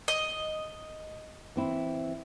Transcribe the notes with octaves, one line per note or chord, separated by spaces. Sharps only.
D#5
E3 C4 E4